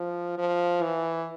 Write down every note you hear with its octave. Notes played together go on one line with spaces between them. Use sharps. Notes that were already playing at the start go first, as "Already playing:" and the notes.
Already playing: F3
F3
E3